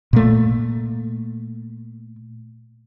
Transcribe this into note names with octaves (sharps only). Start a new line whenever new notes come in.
A#2 A3